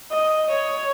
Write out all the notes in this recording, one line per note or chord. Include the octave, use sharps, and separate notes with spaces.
D#5
C#5